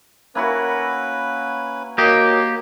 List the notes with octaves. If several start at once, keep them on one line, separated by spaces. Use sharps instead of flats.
A#3 C#4 E4 F#4 B4
A#3 F#4 G4 A#4 C#5 D#5